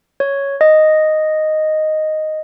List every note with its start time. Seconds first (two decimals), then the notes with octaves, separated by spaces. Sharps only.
0.20 C#5
0.61 D#5